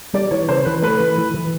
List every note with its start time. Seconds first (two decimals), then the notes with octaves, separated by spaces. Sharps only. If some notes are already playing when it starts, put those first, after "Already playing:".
0.13 G3 D5
0.31 E3 C#5
0.49 C#3 C5
0.65 E3 B4
0.82 A3 B4
1.00 E3
1.18 E3
1.34 E3